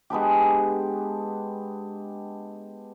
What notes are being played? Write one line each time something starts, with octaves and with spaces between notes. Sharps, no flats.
G#3 B3 D4 G4